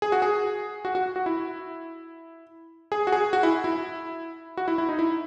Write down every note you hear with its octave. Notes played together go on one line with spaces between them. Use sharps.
G#4
F#4
G#4
F#4
F#4
F#4
E4
G#4
F#4
G#4
F#4
E4
E4
F#4
E4
E4
D#4
E4